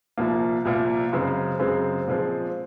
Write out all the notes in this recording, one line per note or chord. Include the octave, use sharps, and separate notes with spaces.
C2 A#2 F3 A#3
C2 A#2 F3 A#3
F#2 C#3 G#3 C4
F#2 C#3 G#3 C4
A#2 F3 G#3 C4